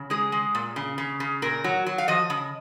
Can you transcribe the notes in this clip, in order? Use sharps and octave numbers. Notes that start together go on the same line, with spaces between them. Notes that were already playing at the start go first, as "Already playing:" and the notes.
Already playing: C#3
G#3 G#4
G#3
A#2
C#3
C#3
C#3
A#2 A#4
F#3
F#3
F5
F3 D#5
C#3